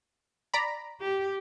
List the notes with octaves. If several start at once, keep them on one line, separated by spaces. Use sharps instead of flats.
D5 A#5 B5
G4